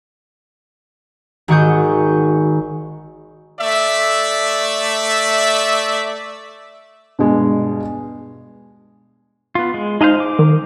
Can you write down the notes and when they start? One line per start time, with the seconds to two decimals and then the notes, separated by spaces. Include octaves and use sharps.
1.48 G#1 D#3 F#4 C#6 D#6 G6
3.60 A3 D5 E5
7.19 G2 B2 G#3
9.55 B3 F4
9.74 G#3
10.01 G#3 D#4 C5 D#5 F5
10.20 D6
10.39 D#3